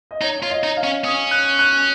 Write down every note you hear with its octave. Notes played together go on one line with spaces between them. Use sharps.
D#5
D#4 C#5
F4 C#5
D#5
D#4
F5
C#4
C#4 D#6
F#6
F#6